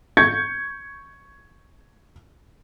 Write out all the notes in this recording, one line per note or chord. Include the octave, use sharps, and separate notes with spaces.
C#6 G6 G#6 C#7